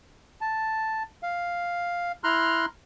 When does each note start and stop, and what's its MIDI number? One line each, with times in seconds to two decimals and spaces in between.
0.41 1.03 81
1.23 2.12 77
2.24 2.66 64
2.24 2.66 82
2.24 2.66 84
2.24 2.66 89
2.24 2.66 90